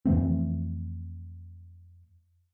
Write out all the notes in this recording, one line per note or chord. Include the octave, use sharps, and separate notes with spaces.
F2 E3 A3 C4